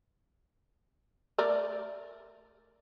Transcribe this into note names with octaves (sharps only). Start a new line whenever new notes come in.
A3 A#4 D5